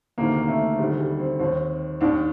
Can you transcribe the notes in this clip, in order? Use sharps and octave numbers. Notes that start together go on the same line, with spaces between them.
D2 C3 D#3 A#3
A#3
A3
D2 C3 D#3 G3
G3
C4
D#2 D#3 C4
D#2 D#3 D4